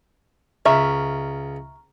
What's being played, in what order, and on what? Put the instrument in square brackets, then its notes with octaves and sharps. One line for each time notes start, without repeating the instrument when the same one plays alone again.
[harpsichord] C#2 [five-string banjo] E5 [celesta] A#5 C#6 F6